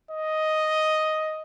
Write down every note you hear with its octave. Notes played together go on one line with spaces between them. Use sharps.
D#5